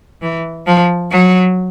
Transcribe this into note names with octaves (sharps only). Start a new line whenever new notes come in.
E3
F3
F#3